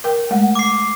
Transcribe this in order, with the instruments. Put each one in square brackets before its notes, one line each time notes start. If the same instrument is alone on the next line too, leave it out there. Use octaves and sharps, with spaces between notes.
[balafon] A#4 G5
G#3 A3 F#5
[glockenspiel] D6 C7